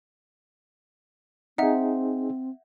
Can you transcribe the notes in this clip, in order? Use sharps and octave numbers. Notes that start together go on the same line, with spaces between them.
C4 D#4 G#4 E5 F#5